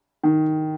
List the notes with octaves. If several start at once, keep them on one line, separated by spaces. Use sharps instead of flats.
D#3